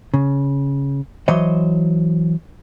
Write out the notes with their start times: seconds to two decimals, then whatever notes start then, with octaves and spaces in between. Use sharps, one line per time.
0.14 C#3
1.28 E3 F#3 C5 C#5 D#5